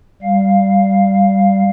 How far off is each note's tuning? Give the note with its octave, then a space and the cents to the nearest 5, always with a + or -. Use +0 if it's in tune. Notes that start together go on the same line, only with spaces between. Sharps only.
G3 +0 F5 +0